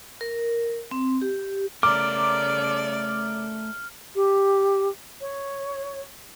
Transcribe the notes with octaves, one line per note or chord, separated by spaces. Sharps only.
A#4
C4
G4
C#3 A3 A#4 D5 D6 F6
G4
C#5